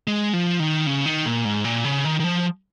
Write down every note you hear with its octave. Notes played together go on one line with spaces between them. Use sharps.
G#3
F3
D#3
C#3
D#3
A#2
G#2
A#2
C#3
D#3
D#3
F3